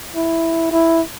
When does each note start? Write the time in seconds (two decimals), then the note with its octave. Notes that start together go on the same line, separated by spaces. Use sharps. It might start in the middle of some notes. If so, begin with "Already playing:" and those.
0.16 E4
0.72 E4